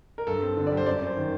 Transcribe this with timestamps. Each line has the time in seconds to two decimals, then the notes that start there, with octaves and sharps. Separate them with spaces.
0.18 A#4
0.27 G2 A4
0.42 C4
0.57 D3
0.67 D5
0.72 G3
0.77 C5
0.86 F#2 D5
1.01 F#2
1.07 C5
1.17 D#3